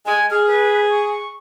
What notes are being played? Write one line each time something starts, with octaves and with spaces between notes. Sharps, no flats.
G#3 G#5
G#4 F6
B4
C#6